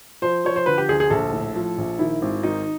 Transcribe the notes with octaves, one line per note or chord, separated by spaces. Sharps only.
F3 C5
F3 C#5
C5
D3 B4
G4
D2 G#4
G#4
A#1 A4
A2
F3
A#1
D#3 E4
G#1
D#3 D#4